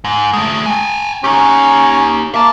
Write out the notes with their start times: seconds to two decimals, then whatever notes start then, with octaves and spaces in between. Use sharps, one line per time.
0.04 G#2
0.33 G#3 A3
0.66 G5 G#5
1.24 C#4 D#4 G4
2.34 A#3 E5 A5